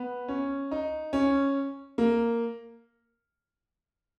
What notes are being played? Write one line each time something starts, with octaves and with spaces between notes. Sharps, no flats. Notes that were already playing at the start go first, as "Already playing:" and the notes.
Already playing: B3
C#4
D#4
C#4
A#3